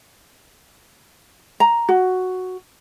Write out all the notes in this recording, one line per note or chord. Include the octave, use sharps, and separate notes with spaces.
A#5
F#4